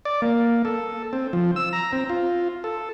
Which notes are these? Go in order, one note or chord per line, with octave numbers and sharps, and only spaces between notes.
D5
A#3
A4
C4
F3
E6
A#5
C4
F4
A4